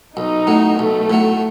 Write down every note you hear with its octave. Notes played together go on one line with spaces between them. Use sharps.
B1 D#4
A2 F#3
B1 A3
A2 F#3